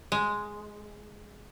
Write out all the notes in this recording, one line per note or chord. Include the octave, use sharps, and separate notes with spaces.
G#3